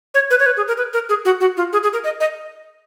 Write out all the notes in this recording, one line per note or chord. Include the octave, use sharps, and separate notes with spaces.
C#5
B4
C#5
B4
G#4
A#4
B4
A#4
G#4
F#4
F#4
F4
G#4
G#4
A#4
D#5
D#5